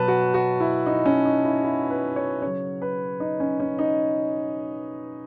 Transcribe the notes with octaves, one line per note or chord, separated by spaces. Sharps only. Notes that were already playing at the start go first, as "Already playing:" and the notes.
Already playing: B2 F#3 B4 A5
F#4
F#4
E4
D#4
C#4
D#4
E4
E4
B4
C#5
C#3 F#3 C#5
B4
D#4
C#4
C#4
D#4